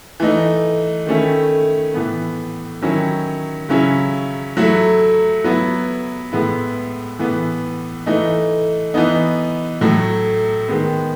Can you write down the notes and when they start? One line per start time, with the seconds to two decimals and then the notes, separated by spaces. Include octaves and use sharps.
0.20 E3 A3 D#4
1.06 D#3 A3 C#4 E4
1.94 A2 E3 B3
2.82 D#3 F#3 C#4 E4
3.69 C#3 F#3 C#4 E4
4.57 F#3 A3 E4
5.44 F#3 B3 E4
6.32 A2 G#3 B3 E4
7.19 A2 E3 B3
8.06 E3 A3 D#4
8.94 E3 B3 D#4
9.81 A2 F#3 A3
10.68 D#3 G#3 B3